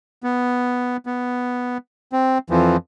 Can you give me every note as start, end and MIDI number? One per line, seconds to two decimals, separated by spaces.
0.24 0.97 59
1.06 1.77 59
2.13 2.38 60
2.50 2.77 41
2.50 2.77 52
2.50 2.77 53